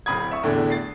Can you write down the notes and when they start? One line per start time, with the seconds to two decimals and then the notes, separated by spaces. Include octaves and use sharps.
0.06 D1 C4 B5 D#6 G#6
0.31 E5 C#6
0.43 E2 A2 D3
0.70 A6 C7